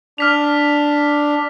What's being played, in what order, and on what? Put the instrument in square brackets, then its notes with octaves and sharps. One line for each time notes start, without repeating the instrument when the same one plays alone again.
[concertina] D4 [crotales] F6 B6 F7